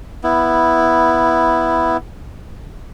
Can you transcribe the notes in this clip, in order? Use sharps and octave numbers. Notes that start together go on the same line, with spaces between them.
B3 E4